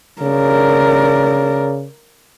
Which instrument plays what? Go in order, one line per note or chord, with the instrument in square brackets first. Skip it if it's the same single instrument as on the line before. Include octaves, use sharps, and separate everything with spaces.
[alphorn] C#3 [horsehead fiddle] A#4 D5